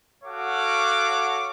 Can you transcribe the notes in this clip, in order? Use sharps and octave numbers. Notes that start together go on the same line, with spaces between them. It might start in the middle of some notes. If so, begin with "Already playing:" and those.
F#4 A4 C#5 F5 F#5 D6